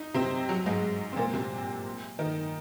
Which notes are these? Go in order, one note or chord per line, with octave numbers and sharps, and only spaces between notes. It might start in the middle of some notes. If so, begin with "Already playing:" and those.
Already playing: D#4
C3 C4
F#3
G#2 G#3
C4
A#2 A#3
C3 C4
D#3 D#4